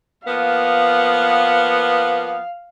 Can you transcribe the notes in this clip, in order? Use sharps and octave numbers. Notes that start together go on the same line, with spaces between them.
F3 A#3 B3 F5